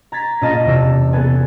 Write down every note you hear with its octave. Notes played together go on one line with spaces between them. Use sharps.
A#5 G#6 A6 B6
A#2 C#4 F4 D#5 A5 A#6
E2 C3 E6
B3 A4 B4 G#5